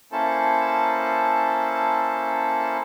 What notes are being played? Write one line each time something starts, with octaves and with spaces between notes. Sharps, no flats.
A#3 C#4 E4 A4 C5 A5